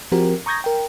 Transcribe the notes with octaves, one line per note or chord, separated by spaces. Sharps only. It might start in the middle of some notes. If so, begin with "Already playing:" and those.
F3 C4 F#4 G4 A#4
A#5 C#6 D#6 G6 G#6 A#6
A#4 G5